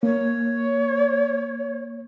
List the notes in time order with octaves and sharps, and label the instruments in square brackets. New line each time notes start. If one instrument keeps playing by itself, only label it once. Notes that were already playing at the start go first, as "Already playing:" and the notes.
[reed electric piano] A#3 [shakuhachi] C#5